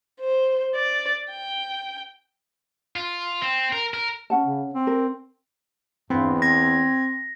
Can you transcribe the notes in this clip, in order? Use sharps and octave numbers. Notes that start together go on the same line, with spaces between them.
C5
D5
G5
F4
C4
A#4
A#4
C#4 F#5 A5
C#3
C4
A#4
E2 G2 B3 C4
C4 G#6 A#6